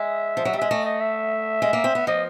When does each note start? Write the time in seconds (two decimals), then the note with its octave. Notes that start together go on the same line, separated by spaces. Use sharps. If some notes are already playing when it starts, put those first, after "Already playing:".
Already playing: G#3 E5
0.37 F3
0.45 F#3
0.53 G3
0.58 G#3 E5
0.70 A3 D#5
0.85 D#5
1.00 E5
1.62 G#3
1.73 A#3
1.84 C4
1.95 B3
2.07 F3 D#5